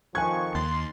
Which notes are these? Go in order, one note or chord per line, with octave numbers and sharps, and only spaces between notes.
F2 D#3 F3 G#5 C#6 F#6 G#6
D#2 C6 A6